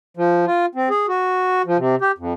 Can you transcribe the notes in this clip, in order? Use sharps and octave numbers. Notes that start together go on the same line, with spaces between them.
F3
F4
C4
G#4
F#4
F3
C3
G4
F2